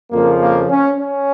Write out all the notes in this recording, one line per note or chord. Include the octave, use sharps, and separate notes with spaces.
F2 C#3 F3 A#3
A#3
C#4
C#4